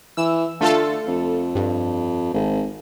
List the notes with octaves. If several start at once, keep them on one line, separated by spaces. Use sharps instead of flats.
E3 E6
D3 A3 F4 A4
F2
G2
G#1